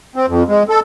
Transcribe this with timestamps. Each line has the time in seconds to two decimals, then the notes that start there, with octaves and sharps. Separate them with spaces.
0.16 C4
0.28 F2
0.48 G#3
0.69 A4